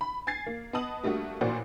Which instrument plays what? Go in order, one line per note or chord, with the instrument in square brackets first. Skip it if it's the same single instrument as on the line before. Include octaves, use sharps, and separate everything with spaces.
[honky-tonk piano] B5
G#5 G#6 A6 C7
A#3
B3 D#5 A5 D#6 F#7
G3 A3 A#3 D4 F#4
A1 A#2 A#3 F#4 C5 D5